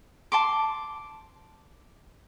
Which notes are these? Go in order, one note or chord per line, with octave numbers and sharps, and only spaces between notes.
A5 C6 D6